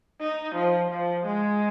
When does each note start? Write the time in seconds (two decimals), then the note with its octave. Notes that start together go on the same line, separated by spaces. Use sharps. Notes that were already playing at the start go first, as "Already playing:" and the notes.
0.20 D#4
0.55 F3
0.90 F3
1.25 G#3